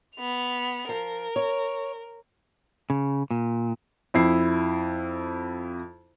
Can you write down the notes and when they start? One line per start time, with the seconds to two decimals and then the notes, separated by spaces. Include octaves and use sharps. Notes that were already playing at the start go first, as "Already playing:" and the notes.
0.16 B3 F7
0.89 F3 A#4
1.36 C#5
2.90 C#3
3.31 A#2
4.14 F2 E4 C7